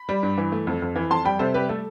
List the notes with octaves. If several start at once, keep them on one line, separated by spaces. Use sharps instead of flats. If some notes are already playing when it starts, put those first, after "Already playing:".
Already playing: B5
G3
G2
E3
A3
F2
F2
E3
F2 A5 C6
G3 G5 B5
C3 A4 C5
G3 G4 B4
A3 A4